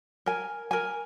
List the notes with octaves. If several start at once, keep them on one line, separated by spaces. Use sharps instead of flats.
A#4 G#5
A#4 G#5